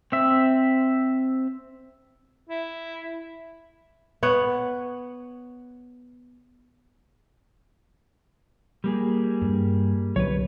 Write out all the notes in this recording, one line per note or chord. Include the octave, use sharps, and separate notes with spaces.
C4 E5
E4
B3 C#5 F#5
G3 A#3 G#4
G2
C2 D3 F#3 B4 C#5